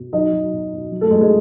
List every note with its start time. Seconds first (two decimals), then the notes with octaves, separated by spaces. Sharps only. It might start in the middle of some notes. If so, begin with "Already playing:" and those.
Already playing: B2
0.13 F#3 D#4 D#5
0.32 F#3
0.53 B2
0.73 B2
0.91 F#3
1.01 A3 A4
1.11 F#3 G#3 G#4
1.21 G#3 G#4